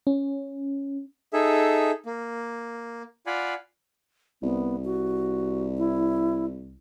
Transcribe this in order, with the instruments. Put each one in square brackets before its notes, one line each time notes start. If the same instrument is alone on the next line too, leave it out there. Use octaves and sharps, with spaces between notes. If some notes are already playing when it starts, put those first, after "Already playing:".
[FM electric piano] C#4
[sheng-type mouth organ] D#4 G#4 A4 E5
A#3
F4 D5 F5 F#5 G#5 B5
[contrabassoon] C2 [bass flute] B3
[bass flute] F#4
E4